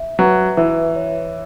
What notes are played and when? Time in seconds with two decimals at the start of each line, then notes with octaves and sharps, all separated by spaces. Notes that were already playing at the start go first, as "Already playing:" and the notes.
Already playing: E5
0.19 F#3 B4
0.57 E3 E5
0.96 C#5